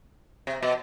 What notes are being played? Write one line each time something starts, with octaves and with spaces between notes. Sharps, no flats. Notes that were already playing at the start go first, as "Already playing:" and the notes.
C3
B2